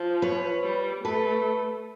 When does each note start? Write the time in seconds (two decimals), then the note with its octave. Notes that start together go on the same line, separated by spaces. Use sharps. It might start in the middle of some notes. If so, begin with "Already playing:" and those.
Already playing: F3
0.22 B4 C#5
0.64 G3
1.04 A3 A4 B4